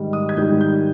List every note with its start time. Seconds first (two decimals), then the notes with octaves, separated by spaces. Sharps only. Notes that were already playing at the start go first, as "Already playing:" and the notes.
Already playing: G#2 D#3 G3
0.13 D#6
0.29 G#6
0.37 G#2 D#3 G3 G6
0.61 G6